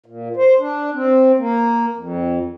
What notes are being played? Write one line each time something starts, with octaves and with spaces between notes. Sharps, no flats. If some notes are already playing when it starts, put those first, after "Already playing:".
A#2
C5
D4
C4
A#3
F2